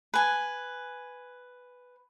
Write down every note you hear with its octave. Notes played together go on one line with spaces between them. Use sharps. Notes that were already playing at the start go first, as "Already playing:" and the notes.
B4 G#5